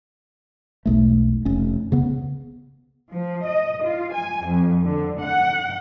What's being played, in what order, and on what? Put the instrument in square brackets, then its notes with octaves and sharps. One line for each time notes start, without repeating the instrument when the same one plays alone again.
[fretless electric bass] E1 B1 A3
F1 C#4
C2 C#3 B3
[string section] F3
D#5
F4
G#5
F2
D3
F#5